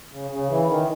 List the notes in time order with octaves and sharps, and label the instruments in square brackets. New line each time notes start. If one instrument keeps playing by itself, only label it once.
[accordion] C#3
C#3
E3
D#3